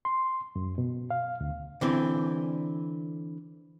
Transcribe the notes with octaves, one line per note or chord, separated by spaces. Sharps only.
C6
F#2
B2
F5
D2
D3 E3 C4